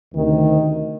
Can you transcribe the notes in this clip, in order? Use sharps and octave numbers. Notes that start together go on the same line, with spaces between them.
D2 C3 D#3